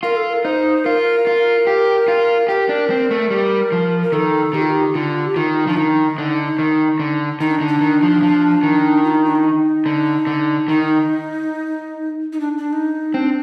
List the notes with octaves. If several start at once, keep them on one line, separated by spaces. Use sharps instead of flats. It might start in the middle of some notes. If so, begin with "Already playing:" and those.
F4 A#4
A4
A#4
D#4 C5
F4 A#4
F4
G4
F4
G4 A#4
D4
C4
A3
G3
F3
A#4
D#3 A4
D#3 G4
F4
G4
D3 F4
G4
D#3 F4
F3 D4
D#3 D#4
D3
D#3
D3
D#3 D#4
D4
D3
D4
D#3
F3
F3
D#3
F4
D#4
D4
D#4
D3
D3
D#3 D#4
D#4
D4
D4
D#4
C4 D4